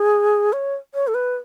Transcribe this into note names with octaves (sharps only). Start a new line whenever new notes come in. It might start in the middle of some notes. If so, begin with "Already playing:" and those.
Already playing: G#4
C#5
C#5
A4
B4